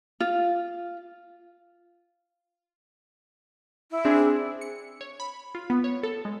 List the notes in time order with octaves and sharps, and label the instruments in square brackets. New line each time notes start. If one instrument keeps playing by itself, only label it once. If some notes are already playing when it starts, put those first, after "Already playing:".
[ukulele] F4
[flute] E4
[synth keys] C4 D4 G#4
[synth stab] C#7
C#5
B5
F4
B3
C#5
A4
G#3